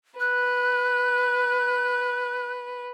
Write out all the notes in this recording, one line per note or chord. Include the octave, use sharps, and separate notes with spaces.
B4 F#6